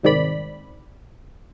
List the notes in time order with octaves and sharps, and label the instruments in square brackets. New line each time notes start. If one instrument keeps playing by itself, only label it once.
[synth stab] C2 G#2 D#3 C4 D5 B5